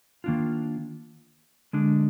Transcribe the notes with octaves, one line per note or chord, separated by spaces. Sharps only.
D#3 A#3 D4 F4
D3 G#3 D4